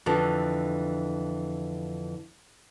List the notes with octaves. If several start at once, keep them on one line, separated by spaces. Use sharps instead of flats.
F2 D3 E3